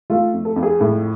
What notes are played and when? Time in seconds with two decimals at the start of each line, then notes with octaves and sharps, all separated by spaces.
0.10 A3 F4
0.34 F2
0.45 A4
0.56 F2
0.63 G#4
0.80 A2 A4